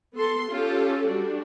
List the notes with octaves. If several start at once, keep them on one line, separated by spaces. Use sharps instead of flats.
B3 A4 C6
C#4 F4 G4 A4
G3 D4 F#4